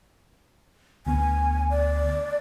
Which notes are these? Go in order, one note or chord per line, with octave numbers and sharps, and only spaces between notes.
D2 B3 G#5
D5